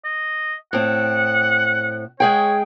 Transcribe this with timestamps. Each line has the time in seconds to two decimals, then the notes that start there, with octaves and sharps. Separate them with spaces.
0.05 D#5
0.73 A2 C4 F#5
2.20 G#3 G#4 C#5 G5